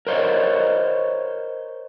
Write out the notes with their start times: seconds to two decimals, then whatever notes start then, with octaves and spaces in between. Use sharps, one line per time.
0.07 A#4 C5 C#5 D#5